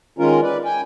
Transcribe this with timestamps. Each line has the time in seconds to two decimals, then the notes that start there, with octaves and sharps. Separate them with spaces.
0.19 D#3 G#3 C#4 F4 A#4
0.42 B4 D5
0.65 G5 G#5